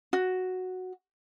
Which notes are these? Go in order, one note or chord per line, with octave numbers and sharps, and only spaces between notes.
F#4